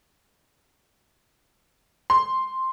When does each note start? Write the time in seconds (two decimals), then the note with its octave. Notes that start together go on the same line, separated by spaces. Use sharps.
2.10 C6